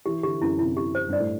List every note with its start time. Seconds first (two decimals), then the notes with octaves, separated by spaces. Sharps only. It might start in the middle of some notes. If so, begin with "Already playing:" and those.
0.06 E3 G4
0.23 D3 G4
0.42 F#2 E4
0.59 C3 E4
0.77 G4
0.95 C5
1.08 G2 D5
1.19 A2